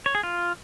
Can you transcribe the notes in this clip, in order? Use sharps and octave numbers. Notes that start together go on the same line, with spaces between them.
C#5
G#4
F4